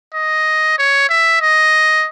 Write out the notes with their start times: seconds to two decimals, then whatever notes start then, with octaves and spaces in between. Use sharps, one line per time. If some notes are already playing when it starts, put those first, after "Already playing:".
0.14 D#5
0.78 C#5
1.09 E5
1.41 D#5